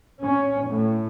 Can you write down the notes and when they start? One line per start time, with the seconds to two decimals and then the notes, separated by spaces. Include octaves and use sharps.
0.21 C#4
0.67 A2